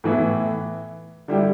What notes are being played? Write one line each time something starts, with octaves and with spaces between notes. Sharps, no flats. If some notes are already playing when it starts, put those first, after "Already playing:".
A2 E3 B3 E4
D3 G3 E4 G4